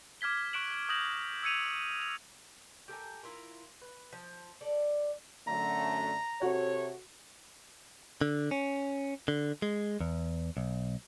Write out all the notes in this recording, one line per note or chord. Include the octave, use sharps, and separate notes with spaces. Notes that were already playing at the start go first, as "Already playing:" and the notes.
D6 F6 G#6 B6 G7
C#6 F#6 D7 E7 F#7
D6 D#6 G6 A#6 F#7
E6 G#6 C#7 D#7 F7
F7
G4 A4 A#4 G#5
E4 F4 A#4
B4
F3
A4 D5
F#2 D3 A3 A#5
C3 F#4 A4 C#5
D3
C#4
D3
G#3
E2
B1